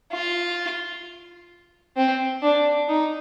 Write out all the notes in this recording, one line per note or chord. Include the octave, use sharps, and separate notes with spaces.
F4
C4
D4
D#4